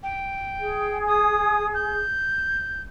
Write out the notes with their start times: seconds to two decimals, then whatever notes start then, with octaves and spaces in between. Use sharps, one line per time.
0.03 G5
0.59 G#4
1.07 D#6
1.74 G6